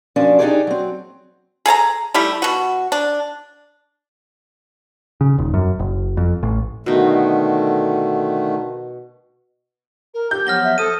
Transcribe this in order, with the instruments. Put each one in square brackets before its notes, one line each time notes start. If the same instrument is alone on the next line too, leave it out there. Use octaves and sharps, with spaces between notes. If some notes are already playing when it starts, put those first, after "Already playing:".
[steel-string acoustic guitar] F#2 F3 C#4 D4 D5
D4 D#4 F4 G4 G#4 D5
F#3 C4
[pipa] G#4 A4 A5 A#5
G3 A3 E4 G4
B2 F#4
D4
[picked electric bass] C#3
D#1
F#2
F#1
F2
A1
[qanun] B2 D#4 [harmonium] D3 D#3 A3
[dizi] A#4
[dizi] G4 [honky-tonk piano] G6
[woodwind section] F3 F#3 B3 [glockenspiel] F6 A#6 G7
[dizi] E5
[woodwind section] F3 [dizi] A4 [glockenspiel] D#6 D#7